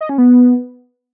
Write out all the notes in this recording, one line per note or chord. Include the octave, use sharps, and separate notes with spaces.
D#5
C#4
B3